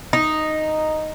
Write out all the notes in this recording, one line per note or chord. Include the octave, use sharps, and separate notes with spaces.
D#4